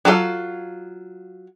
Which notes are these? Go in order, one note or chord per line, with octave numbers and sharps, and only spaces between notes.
F#3 F4 F#4 A4 F5